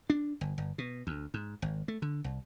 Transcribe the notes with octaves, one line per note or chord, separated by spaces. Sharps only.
D4
G1
G1
B2
D2
G#2
G#1
A3
D3
C2